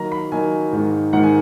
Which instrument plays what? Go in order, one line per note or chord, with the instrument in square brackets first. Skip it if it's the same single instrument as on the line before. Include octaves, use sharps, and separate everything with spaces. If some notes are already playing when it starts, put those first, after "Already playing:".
Already playing: [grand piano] D#3 F#3 A#3 D#4 A#5
B5
D#3 F#3 A#3 D#4 G#5
G#2 D#3 A#3
G#2 D#3 A#3 F#5
G#5